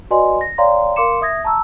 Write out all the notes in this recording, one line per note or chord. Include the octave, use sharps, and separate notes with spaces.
F#4 B4 D5 D#5 G#5 C6
A#6
C#5 D5 F5 G5 A#5 C6
A#4 F5 C6 D6 C#7 E7
E5 D#6 G#6 A#6
A5 A#5 C#6 E6